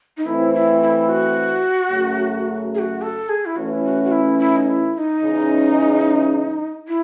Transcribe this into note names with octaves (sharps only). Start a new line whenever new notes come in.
D#4
E3 A3 C4 E4
E4
E4
F#4
F#2 C#3 F#3 A3
G#4
F#4
A4
G#4
E4
E3 A3 C#4 F#4
E4
F#4
F#4
E4
E4
D#4
E4
E4
D#4
E2 C#3 G#3 C#4 G#4
E4